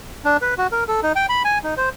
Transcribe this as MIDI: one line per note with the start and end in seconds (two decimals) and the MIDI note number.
0.25 0.37 62
0.41 0.54 71
0.58 0.67 66
0.72 0.84 70
0.88 1.00 69
1.03 1.13 63
1.16 1.26 79
1.29 1.43 83
1.45 1.58 80
1.63 1.74 63
1.77 1.89 72